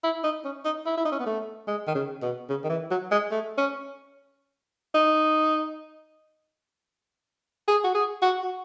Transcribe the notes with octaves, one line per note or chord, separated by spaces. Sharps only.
E4
D#4
C#4
D#4
E4
E4
D#4
C#4
B3
A3
G#3
D#3
C#3
B2
C#3
D#3
E3
F#3
G#3
A3
C#4
D#4
G#4
F#4
G#4
F#4
F#4